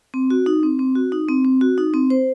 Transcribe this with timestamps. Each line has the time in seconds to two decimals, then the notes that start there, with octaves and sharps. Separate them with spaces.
0.14 C4
0.30 F#4
0.46 D#4
0.63 C4
0.79 C4
0.95 F#4
1.12 D#4
1.29 C4
1.45 C4
1.61 F#4
1.78 D#4
1.94 C4
2.10 C5